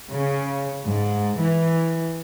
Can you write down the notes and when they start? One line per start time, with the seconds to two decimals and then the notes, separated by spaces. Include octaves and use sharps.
0.12 C#3
0.86 G#2
1.38 E3